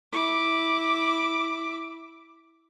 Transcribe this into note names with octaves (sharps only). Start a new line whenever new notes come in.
E4 D6